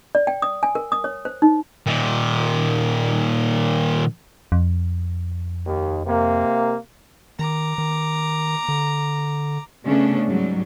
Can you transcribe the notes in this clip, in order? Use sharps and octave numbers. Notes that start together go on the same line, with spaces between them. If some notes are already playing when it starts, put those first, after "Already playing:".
D5
G5
D#6
G#5
A#4
D#6
C#5
C5
D#4
A#2 D#3
F2
D#2
C3 A#3
D#3 A#5 D6
D#3
D3
C#3 A3 B3 C#4 D4
G#2 F#3 G3